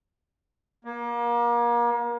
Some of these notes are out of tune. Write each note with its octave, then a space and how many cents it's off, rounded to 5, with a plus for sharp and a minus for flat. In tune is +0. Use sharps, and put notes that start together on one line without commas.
A#3 +35